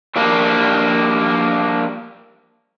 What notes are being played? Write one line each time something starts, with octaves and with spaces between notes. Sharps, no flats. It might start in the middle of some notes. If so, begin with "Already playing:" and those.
F3 G3 A#3 D4